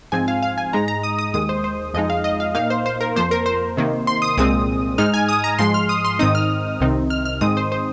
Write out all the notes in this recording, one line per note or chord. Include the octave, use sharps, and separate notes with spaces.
G#2 F3 C4 G#5
F5
F5
G#5
G#2 G#3 D#4 A#5
A#5
D#6
D#6
D#2 D#3 G#3 D#6
C5
C5
F2 F3 G#3 D#4 D#5
F5
D#5
F5
A#2 A#3 D#4 F5
C5
C5
A#4
F2 F3 A#3 C5
A#4
C5
C3 D#3 A#3
C6
D#6
C2 A#2 G#3 C4 D#6
G#2 G#3 D#4 F6
G#5
D#6
A#5
G#2 F3 G#3 C6
F6
D#6
C6
G#2 D#3 C4 D#4 D#6
F6
C2 C3 D#3 C4 D#4
F6
F6
G#2 D#3 G#3 C4 D#4 D#6
C5
C5